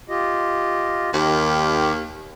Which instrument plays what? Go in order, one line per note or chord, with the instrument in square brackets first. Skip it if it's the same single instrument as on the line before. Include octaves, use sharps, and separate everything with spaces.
[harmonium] F4 G4 D#5
[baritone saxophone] D#2 [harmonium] D#3 G4